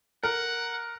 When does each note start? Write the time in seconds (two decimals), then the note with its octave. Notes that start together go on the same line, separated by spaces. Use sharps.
0.23 A#4 F#5